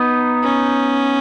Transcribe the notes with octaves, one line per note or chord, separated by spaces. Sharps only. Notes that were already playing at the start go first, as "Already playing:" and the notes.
Already playing: B3 D#4
C#4